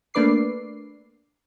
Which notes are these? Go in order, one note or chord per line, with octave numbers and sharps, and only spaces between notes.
A3 A#3 D4 B4 D6 C7